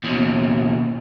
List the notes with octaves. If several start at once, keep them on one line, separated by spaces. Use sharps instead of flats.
D#2 B2